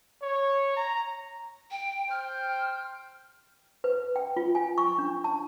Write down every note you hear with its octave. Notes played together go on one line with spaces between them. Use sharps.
C#5
A#5
G5
C5 G5 F6
B4
G5
F4
G#5
C#6
D4
A5